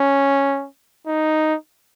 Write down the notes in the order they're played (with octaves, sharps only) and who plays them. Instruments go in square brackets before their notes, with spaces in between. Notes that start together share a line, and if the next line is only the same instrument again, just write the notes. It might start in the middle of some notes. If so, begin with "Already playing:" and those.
Already playing: [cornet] C#4
D#4